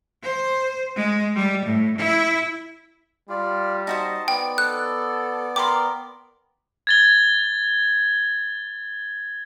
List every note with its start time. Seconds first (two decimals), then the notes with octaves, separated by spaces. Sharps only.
0.23 C5
0.96 G#3
1.35 G3
1.65 A2
1.97 E4
3.29 G3 F4 D5
3.87 D#4 F#4 C5 D#5 A5
4.28 B3 D5 G5
4.58 A4 F#6
5.56 A#4 G5 B5 C6 D6
6.87 G#6 A6 G7